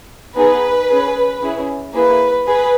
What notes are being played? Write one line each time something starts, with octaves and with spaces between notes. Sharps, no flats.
B3 D#4 G#4 B4
C#4 G#4
C#4 E4 G#4
A#3 E4 G#4 B4
G#4 B4